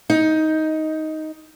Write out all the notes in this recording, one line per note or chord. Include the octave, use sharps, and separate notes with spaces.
D#4